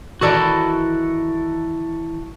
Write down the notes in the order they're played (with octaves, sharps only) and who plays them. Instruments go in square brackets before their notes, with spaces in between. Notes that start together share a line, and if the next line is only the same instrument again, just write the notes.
[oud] D#3 E3 D5 [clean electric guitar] F#4 A4 A#4